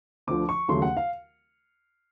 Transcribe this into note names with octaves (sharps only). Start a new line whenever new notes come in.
D2 D3 F3 D6
C#6
D#2 C#3 F#3 A3 C6
F#5
F5